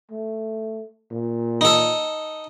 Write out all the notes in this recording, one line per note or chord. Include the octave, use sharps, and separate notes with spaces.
A3
A#2
D#4 A4